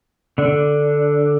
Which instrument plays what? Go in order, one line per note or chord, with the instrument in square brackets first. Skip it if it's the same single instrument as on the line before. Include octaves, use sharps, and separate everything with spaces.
[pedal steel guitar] D3 D4